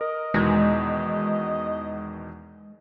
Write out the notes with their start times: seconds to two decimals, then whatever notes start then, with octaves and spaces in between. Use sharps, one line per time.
0.01 A#4 D#5
0.34 E2 B2 D#3 G#3